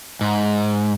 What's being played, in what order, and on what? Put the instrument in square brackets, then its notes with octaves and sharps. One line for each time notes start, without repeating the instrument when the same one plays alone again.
[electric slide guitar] G#2